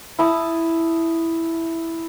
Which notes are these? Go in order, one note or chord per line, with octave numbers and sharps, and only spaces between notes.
E4 A5 D#6